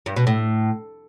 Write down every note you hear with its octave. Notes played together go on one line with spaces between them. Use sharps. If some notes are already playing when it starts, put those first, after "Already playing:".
G2
B2
A2